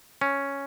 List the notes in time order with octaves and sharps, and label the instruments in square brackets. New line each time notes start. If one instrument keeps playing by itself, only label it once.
[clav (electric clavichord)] C#4